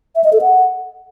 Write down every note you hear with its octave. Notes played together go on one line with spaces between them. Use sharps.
E5
D#5
A4
F#5